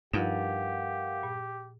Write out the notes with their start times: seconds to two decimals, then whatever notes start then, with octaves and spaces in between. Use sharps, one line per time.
0.13 G2 F3 D#4 F4 G4 A#4 F5 F#5
1.23 A#2